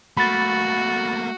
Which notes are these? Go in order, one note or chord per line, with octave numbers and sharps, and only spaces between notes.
A3 A#3 F#4 B5 A6